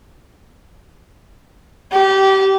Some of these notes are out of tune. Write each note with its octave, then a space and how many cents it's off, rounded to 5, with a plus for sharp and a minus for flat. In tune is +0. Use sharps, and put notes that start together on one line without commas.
G4 -25